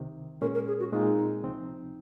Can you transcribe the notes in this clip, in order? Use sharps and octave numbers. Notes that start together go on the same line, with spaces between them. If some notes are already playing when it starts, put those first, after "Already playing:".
Already playing: C2 C3 D#3
A#2 G#3 C#4 A#4
A#4
G#4
F#4
A#2 G#3 C4 D#4 F4
C#2 C3 F3 C4 D#4